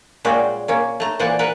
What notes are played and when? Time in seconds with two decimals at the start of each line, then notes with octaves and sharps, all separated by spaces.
0.25 A#2 G3 G#3 C#4 F#4 G4
0.68 A#3 C#4
1.00 A3 A#5
1.19 A#2 E3 C5 D5 F#5 G#5
1.39 A#4 B4 F#5